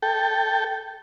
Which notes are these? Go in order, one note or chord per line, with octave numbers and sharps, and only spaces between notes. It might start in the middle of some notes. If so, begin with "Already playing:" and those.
A4 G5